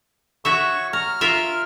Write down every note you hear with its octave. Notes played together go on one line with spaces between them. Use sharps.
F#4 C#5 E5 C#6
A#5 F6
F4 A#4 E5